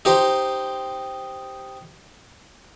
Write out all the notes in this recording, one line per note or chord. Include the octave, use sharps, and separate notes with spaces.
D#4 G4 C5